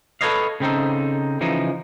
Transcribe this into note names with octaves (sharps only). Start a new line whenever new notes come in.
A4 B4 C#5 D#5 F5
C#3 C4 D#4 A4
C#3 E3 F3 D#4